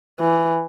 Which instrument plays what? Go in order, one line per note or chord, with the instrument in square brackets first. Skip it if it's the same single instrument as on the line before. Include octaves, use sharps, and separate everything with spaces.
[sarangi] E3